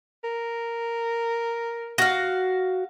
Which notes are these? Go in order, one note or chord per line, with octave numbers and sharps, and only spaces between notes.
A#4
F#4 F5